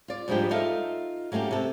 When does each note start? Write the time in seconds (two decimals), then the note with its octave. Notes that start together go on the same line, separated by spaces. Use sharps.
0.08 F4 D5
0.28 G#2 F3 G3 G#3 D4 G4
0.51 D#4 F4 A4 E5 F5
1.32 F#3 A3 A#3 C#4 G4
1.51 C3 A4